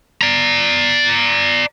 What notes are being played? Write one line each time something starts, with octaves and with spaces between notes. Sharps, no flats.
D5 A#5